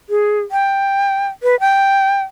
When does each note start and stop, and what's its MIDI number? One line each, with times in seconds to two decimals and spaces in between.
0.10 0.40 68
0.52 1.27 79
1.43 1.59 71
1.60 2.21 79